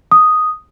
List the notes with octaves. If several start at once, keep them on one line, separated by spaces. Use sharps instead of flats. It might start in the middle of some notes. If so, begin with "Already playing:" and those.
D#6